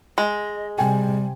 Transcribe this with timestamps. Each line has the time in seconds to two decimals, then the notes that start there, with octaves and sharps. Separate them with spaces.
0.18 G#3 D#5
0.78 C3 G3 G5 G#5